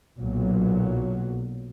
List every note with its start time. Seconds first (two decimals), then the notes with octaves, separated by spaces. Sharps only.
0.19 B1 A#2 F#3